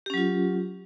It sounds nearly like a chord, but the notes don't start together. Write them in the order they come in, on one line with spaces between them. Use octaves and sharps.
G4 C#4 F#3 F4